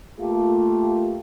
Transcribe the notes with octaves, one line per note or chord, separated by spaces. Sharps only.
A3 A#3 F4 G4